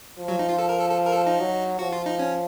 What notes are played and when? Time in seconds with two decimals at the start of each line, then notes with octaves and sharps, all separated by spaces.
0.19 F3
0.28 F#3
0.39 D#4
0.49 F4
0.59 A4
0.69 A#4
0.79 A4
0.90 A4
1.06 A#4
1.13 A4
1.27 D#4
1.40 F#3
1.79 F3 F#4
1.93 F4
2.06 D#4
2.19 C#4